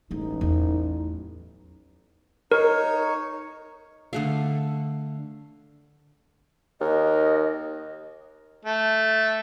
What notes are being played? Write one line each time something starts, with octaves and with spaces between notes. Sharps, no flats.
A1 D3 G#3 D#4
E2 F#3
D#4 A#4 C#5
D3 A3 F5
D#2 D#5
A3